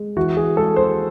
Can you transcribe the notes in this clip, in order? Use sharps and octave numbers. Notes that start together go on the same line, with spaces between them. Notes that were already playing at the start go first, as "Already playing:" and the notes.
Already playing: G#3
E3 F#4
G#4
G#3 A4
C5